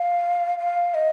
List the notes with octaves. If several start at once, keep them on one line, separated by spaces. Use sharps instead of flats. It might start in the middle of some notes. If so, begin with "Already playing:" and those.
Already playing: F5
F5
D#5